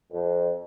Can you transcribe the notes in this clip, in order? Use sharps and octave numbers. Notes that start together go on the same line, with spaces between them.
F2